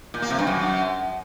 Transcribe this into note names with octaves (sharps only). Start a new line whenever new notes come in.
A#2
A#3
C3
G2
F#2